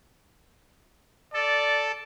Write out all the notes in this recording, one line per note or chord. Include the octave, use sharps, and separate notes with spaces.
A4 D5